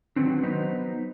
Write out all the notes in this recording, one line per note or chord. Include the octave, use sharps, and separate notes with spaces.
D#3 F#3 B3 C4 D4
F#3 B3 D#4 B4 C5